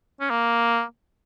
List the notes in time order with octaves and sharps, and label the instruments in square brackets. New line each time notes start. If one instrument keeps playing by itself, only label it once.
[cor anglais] C#4
A#3